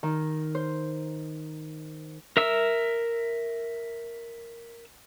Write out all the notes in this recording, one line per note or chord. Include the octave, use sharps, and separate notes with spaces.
D#3
C5
A#4 E5 E6